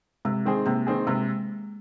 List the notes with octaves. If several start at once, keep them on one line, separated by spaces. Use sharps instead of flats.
C3 G#3
D#3 C4 G#4
C3 A#3
D#3 C4 G#4
C3 G#3